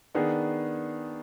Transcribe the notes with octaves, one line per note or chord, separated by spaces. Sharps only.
D#3 B3 D4 G#4